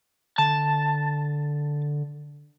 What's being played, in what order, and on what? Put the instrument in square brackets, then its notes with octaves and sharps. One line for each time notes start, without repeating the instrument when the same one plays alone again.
[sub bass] D3 [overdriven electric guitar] A5